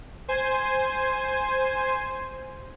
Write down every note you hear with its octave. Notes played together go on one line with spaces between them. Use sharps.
C5 G#5